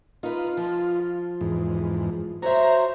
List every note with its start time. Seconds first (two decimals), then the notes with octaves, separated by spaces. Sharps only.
0.23 D#4 F4 B4
0.57 F3
1.41 E2 G#2
2.42 F#4 C5 C#5 E5 A#5